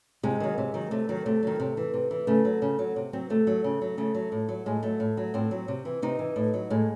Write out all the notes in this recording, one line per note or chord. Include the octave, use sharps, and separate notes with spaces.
C3 G#3
D#3 F#3
C3
D#3 F#3
C3 A3
D#3 F#3
C3 A3
D#3 F#3
C3
E3
C3
E3
C#3 A3
F#3
C#3
F#3
C3
F#3 C4
C3 A3
F#3
C#3
F#3
C#3 A3
F#3
A2
F#3
A2 G#3
F#3 A3
A2
F#3
A2 C4
F#3
C3
E3
C3 D#4
E3
A2
F#3
A2 G#3